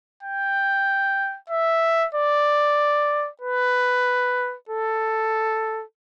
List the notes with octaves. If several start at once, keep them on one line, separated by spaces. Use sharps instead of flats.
G5
E5
D5
B4
A4